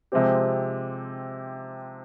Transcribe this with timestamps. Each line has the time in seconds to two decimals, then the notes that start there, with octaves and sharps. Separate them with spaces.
0.12 C3 F3 G#3 C4 G4